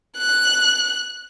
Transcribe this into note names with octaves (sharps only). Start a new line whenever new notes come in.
F#6